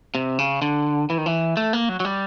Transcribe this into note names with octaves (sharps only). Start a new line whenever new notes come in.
C3
C#3
D3
E3
D#3
E3
A3
A#3
F#3
F#3
G3